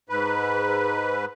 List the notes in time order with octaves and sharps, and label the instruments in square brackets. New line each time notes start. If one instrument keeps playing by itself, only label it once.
[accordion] G#2 B4